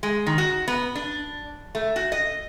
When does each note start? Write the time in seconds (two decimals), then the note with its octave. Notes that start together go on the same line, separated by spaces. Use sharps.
0.03 G#3
0.26 D#3
0.38 F#4
0.68 B3
0.95 D4
1.75 A3
1.96 F#4
2.12 D#5